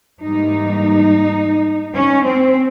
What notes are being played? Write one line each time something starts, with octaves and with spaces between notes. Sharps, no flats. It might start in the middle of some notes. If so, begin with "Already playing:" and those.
G#2 E3 G3 A#3 D#4
C#4
C4